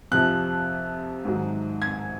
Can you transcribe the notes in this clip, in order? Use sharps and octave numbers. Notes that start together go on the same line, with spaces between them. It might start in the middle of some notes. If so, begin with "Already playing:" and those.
F2 C3 F3 F#6
G#2 D#3 F#3
G#6